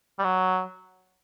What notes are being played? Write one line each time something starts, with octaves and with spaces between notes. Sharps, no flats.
G3
F#3